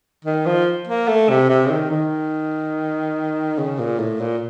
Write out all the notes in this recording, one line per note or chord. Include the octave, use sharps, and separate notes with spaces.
D#3
F3
A#3
A3
C3
C3
C#3
D#3
D#3
C#3
A#2
A2
A#2